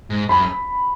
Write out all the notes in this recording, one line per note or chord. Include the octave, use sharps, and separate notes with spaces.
G#2
F#2 B5